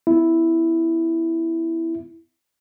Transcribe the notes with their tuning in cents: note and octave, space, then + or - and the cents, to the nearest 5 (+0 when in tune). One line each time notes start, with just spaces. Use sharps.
B3 +45 E4 +0